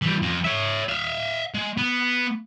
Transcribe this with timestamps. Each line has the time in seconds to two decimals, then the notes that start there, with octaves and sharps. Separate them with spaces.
0.02 E3 G3
0.22 F2
0.45 C#5 E5
0.89 E5 F5
1.55 G#3
1.78 B3